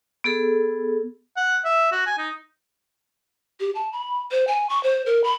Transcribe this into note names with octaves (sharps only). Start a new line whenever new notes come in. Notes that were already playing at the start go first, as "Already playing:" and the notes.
B3 G#4 A4
F#5
E5
F#4
G#5
D#4
G4
A5
B5
C5
G#5
C#6
C5
A#4
B5